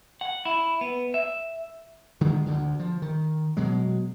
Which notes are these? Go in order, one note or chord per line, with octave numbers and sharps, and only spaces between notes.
F#5
E4
B3
E5
D3 D#3 G#3
D2 D3
F3
D#3
B2 F#3 G#3